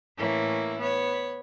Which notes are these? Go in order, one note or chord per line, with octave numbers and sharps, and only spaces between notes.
A2 E3 A#3 C#4 E4
B3 C#5